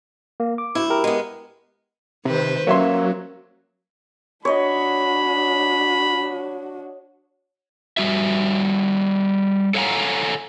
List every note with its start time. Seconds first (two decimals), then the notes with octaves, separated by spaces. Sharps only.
0.40 A#3
0.58 D6
0.75 D2 E4
0.90 G4 A#4
1.04 G#3 B3
2.25 C3 D#3 B4 C5
2.67 F#3 A#3 C#4 C#5 E5 C6
4.45 D4 F#4 C#5 D#5 B5
7.97 G3 F#4 E5
9.74 A4 C#5 F5 F#5 G#5 A#5